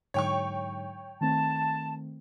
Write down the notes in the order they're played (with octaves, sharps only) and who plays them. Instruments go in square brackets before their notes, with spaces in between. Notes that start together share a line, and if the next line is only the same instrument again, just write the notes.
[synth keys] G#2 D3 F#3 [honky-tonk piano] C#5 G5 C#6
[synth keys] D#3 A3 C4 [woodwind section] A5